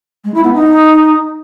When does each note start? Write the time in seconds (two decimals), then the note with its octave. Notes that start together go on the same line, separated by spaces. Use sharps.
0.24 G#3
0.34 E4
0.44 B3
0.54 D#4